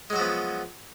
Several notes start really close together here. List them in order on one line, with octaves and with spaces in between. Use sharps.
G#3 F#3 F#4 F3 B3